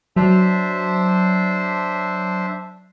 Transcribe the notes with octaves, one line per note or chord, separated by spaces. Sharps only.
F#3 D4 C5 E5